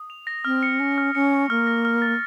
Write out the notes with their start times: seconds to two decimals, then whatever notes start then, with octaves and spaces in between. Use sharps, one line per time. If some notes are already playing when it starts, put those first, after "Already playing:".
Already playing: D#6
0.10 F7
0.27 A#6
0.45 C4 F6
0.63 C#7
0.80 C#4 C#7
0.98 F6
1.15 C#4 C#7
1.32 C#6
1.50 A#3 F6
1.67 A#6
1.85 F6
2.02 A6